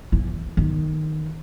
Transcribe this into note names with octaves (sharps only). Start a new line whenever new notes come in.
E3
D#3